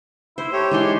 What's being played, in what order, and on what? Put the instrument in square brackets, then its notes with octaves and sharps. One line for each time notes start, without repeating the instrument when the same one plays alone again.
[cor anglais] E4 [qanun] C5
[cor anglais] A3 [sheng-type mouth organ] G4 C#5
[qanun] E3 D#4 C6 [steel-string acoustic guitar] G#3 G#4 [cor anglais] D4